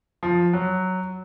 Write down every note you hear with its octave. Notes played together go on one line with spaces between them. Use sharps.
F3
F#3